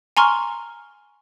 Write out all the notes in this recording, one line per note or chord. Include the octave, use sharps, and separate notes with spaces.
G#5 A#5 C6 C#6 F6